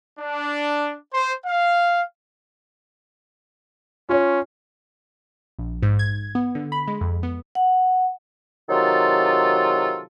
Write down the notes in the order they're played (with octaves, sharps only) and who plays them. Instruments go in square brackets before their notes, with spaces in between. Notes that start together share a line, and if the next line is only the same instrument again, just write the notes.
[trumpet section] D4
C5
F5
[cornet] C#4 [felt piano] F4 C#5
[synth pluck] A#1
G#2
G#6
B3
D3
B5
G#3
F2
B3
[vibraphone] F#5
[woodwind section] C3 D#3 F#3 F4 A4